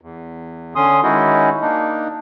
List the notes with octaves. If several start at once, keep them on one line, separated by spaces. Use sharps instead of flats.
E2
D3 C#4 C6 D#6
D#3 G#3 C#4 D#4 E4 F#4
A#3 D4 D#4